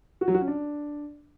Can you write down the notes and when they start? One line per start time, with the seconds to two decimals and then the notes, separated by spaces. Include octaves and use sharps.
0.21 F#4
0.28 F#3
0.34 F#4
0.41 C#4
0.48 D4